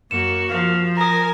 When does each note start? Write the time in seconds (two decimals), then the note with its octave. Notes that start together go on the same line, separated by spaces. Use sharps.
0.11 F#2 A#3 F#4 C#7 E7
0.49 F3 F5
0.97 A#4 G#5 A#5 D#6 A#6